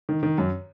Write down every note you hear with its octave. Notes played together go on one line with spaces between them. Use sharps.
D#3
D#3
F#2